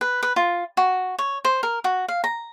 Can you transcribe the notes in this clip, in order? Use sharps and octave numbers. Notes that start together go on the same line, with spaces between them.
B4
B4
F4
F#4
C#5
C5
A#4
F#4
F5
A#5